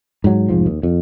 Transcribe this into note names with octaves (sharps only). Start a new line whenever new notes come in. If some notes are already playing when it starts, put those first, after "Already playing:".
G#2 F#3
F1 G#2 F3
D#2
F2